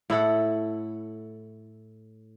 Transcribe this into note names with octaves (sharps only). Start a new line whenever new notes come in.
A2 E4 A4 F#5